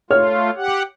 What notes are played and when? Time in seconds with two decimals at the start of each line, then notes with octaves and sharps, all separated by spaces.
0.11 A3 F4 C#5 F6
0.56 G4 F#5